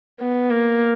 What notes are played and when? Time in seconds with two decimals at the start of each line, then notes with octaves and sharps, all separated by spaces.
0.20 B3
0.51 A#3